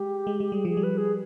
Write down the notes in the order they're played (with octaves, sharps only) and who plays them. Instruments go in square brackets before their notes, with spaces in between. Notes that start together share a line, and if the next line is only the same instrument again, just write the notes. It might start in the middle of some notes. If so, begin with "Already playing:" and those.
Already playing: [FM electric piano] G#3 [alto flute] G4
[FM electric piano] G#3
G#3
[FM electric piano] G3 [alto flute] G#4
[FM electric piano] F3 [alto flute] G#4
[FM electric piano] G3
[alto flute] B4
G#4